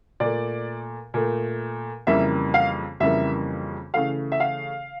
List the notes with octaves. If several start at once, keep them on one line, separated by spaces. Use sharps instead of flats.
A#2 A3 D5
A#2 A3
F2 C#3 E3 G3 A#3 E5
F5
F2 C#3 E3 G3 A#3 E5
C#3 E3 A3 F5
E5
F5